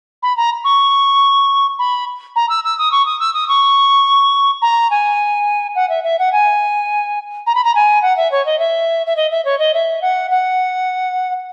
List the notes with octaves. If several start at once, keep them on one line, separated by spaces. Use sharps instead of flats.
B5
A#5
C#6
B5
A#5
E6
E6
D#6
C#6
D#6
E6
D#6
C#6
A#5
G#5
F#5
E5
E5
F#5
G#5
A#5
B5
A#5
G#5
F#5
E5
C#5
D#5
E5
E5
D#5
E5
C#5
D#5
E5
F#5
F#5